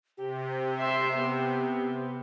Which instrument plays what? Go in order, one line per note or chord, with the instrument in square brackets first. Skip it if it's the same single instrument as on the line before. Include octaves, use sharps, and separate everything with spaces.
[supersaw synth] C3 [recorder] G4
[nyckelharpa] E5 C6
B3